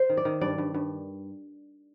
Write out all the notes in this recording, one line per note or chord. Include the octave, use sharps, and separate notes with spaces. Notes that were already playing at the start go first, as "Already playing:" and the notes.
Already playing: C5
D#3
D5
D#3
G2 D5
G2
G2